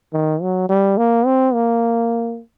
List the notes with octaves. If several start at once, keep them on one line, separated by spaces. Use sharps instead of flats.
D#3
F#3
G3
A#3
C4
A#3